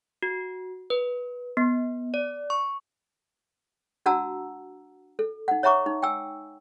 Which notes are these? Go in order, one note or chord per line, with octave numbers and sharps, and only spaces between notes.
F#4
B4
B3
D5
C#6
D4 F#4 F#5 A5 A#5 E6
A4
D#4 F#5
C#5 E5 F#5 A#5 C#6 D6
D#4
G5 G#5 E6